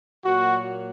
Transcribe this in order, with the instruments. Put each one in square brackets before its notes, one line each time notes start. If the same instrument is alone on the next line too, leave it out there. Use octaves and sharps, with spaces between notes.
[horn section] A#2 F#3 A#3 F#4